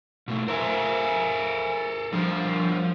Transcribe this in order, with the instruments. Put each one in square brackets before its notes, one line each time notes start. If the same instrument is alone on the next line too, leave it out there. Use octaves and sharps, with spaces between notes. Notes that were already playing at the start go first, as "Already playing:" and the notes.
[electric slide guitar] B2 A3
[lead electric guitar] A4 A#4 [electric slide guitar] C5 E5 G#5
[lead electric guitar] F3 [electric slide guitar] G3 D4 A#4